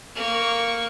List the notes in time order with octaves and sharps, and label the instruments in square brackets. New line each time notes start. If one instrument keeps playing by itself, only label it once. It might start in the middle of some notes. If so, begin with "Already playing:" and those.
[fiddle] A#3 C#6